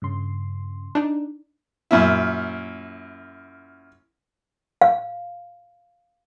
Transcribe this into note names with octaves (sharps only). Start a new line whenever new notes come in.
G2 C#3 C6
D4 D#4
F#2 A#2 E4
F5